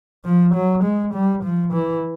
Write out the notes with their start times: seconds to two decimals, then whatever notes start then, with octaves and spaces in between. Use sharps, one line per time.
0.25 F3
0.54 F#3
0.84 G#3
1.14 G3
1.44 F3
1.73 E3